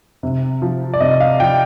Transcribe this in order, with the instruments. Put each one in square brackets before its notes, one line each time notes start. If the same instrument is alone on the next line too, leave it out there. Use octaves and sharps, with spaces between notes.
[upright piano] C3
F3
D5
C3 D#5
F5
F3 G5